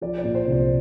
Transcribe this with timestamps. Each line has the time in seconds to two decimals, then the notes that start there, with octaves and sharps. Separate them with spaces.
0.01 F3 D5
0.18 D5
0.24 A#2
0.35 C5
0.47 C2
0.52 C5